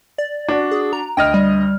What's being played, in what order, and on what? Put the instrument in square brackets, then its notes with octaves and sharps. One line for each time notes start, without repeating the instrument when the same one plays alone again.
[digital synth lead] D5
[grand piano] D4 F#4
[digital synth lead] G#4
A#5
[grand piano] D2 D#5 F6 [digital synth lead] G5
[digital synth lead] G3